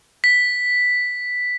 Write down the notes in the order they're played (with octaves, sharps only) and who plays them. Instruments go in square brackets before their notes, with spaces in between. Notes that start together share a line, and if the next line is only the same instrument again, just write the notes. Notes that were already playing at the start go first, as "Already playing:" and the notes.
[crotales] B6